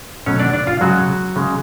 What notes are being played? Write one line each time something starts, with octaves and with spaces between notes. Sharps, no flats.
B2 F#3 A3 C#4 C#5
D4 D5
D4 D5
F4 F5
C#3 F#3 G#3 F#4
C#3 G#3